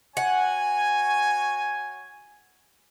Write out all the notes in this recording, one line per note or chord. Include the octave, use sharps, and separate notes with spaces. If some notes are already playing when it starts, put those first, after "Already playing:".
F#4 C#5 F#5 G#5